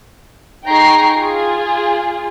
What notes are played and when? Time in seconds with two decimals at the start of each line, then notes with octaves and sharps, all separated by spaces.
0.68 D#4 G#4 G5 A#5 C#6 C7
1.19 F4 G#4